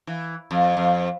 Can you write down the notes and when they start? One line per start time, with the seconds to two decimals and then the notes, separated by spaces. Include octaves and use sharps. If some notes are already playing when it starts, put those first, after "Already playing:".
0.07 E3
0.51 F2
0.77 F2